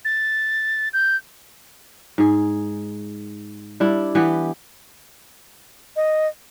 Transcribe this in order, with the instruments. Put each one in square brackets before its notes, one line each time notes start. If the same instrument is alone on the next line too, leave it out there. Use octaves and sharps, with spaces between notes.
[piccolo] A6
G6
[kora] G#2 G#4
G3 D4 E4
E3 B3 G4
[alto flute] D#5